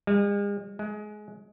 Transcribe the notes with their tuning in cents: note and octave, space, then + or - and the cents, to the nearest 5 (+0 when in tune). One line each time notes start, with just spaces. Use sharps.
G#3 -45
G#3 +20